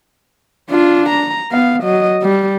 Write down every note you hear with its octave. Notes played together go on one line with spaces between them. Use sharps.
D4 F4
A#5
B3 F5
F#3 D#5
G3